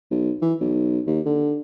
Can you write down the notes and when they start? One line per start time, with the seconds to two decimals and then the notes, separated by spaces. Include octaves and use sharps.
0.11 B1
0.42 E3
0.60 B1
1.07 D#2
1.26 D3